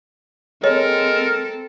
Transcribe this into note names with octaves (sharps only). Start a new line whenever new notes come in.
G#3 C4 A4 A#4 C#5